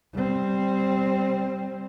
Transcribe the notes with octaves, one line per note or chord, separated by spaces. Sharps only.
G3 C4